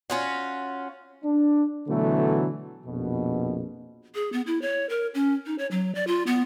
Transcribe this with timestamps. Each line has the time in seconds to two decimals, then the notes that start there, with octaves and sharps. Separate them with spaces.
0.10 C#4 F4 F#4
1.24 D4
1.88 B2 D3 E3 F#3 A3
2.86 A#1 F2 B2
4.15 G#4
4.33 B3
4.47 E4
4.62 C#5
4.89 A#4
5.14 C#4
5.46 D#4
5.58 C#5
5.71 F#3
5.95 D5
6.07 F4
6.27 B3